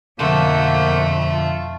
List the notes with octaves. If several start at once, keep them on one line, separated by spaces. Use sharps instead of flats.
F2 B2 D3 A3 A#3 F#5 C6 G6
F4